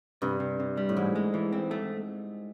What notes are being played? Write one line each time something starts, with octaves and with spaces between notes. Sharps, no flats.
G2 C3
C3
C3
G3
A2
G#2 E3
G#3
E3
C4
A3